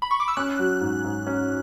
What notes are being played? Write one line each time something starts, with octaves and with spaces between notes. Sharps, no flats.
B5
C#6
D6
E6
C#4 F#6
F#3
G#2
G#2
C#4